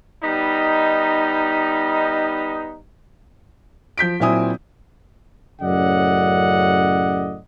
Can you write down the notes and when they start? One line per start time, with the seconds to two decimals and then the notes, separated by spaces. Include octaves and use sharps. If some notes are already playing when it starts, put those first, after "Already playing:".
0.23 G3 B3 D#4
3.98 F3 G6 B6 D7
4.20 A#2 F#3 C4 E4 G#5 D#6
5.62 F#2 A2 C#3 D5 D#5 F#5